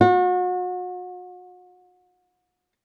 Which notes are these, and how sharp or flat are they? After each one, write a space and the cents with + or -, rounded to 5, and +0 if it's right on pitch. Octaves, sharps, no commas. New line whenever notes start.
F#4 -35